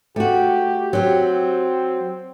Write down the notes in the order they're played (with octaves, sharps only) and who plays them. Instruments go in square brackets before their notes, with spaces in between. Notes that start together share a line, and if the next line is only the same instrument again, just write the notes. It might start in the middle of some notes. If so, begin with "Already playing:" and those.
[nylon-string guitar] A3 F#4 [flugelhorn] G4
[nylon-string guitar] F#3 G4 [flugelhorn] C4